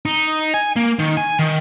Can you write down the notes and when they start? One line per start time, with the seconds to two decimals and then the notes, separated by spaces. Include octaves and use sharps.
0.06 D#4
0.54 G#5
0.76 A#3
0.99 D#3
1.17 G#5
1.39 D#3